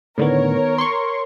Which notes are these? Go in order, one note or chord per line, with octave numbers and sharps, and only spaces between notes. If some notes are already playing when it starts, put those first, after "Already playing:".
A2 D3 D#3 B3 A#4 C#5
C6 C#6